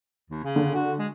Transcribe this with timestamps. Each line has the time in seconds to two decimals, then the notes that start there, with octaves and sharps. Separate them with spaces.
0.31 D#2
0.44 C#3
0.56 D3
0.75 F#4
0.99 G#3